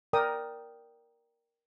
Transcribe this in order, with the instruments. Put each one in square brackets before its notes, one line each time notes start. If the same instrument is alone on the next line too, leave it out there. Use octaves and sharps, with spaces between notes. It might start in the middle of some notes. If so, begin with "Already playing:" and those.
[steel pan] A#4 D5 G5 D#6